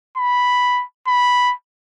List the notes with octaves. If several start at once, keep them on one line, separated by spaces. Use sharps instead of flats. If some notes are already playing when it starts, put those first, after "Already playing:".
B5
B5